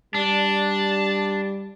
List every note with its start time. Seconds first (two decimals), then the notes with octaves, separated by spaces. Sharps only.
0.15 G3 D4 A5